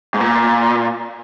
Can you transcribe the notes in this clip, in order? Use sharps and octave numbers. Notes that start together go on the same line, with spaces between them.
G#2
A#2